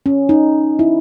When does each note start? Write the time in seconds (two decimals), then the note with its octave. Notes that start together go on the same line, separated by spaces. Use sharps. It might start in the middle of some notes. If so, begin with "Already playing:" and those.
0.06 C#4
0.29 D#4
0.79 E4